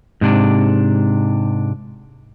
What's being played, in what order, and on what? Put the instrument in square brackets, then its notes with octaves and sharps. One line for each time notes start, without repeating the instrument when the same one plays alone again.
[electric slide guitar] G#2 C3 D4